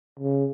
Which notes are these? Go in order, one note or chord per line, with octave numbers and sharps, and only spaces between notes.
C#3